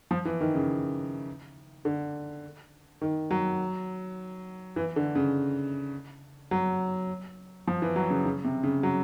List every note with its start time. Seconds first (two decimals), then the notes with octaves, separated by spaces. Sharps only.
0.11 F3
0.25 E3
0.41 D#3
0.55 C#3
1.85 D3
3.01 D#3
3.31 F#3
4.76 E3
4.96 D3
5.15 C#3
6.51 F#3
7.67 F3
7.82 E3
7.96 F#3
8.10 C#3
8.25 C#3
8.44 C3
8.64 C#3
8.83 F#3